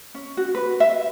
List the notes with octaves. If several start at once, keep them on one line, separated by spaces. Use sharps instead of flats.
C#4
F#4
B4
E5